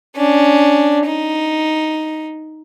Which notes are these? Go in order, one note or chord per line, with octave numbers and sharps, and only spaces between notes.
C#4 D4
D#4